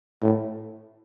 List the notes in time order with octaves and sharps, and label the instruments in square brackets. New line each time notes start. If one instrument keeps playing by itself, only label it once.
[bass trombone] A2